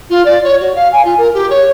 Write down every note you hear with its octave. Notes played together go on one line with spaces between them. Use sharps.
F4
D5
C#5
F#4
F5
G#5
F4
A#4
G4
C#5